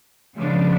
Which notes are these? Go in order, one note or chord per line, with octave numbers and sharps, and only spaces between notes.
C#3 F3 G#3 B3 D4